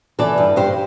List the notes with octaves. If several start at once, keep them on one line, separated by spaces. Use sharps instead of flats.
E3 A4 D5
G2
G2 G4 C5